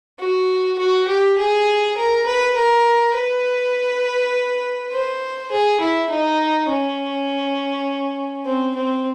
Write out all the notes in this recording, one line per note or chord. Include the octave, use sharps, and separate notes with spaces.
F#4
F#4
G4
G#4
A#4
B4
A#4
B4
C5
G#4
E4
D#4
C#4
C4
C4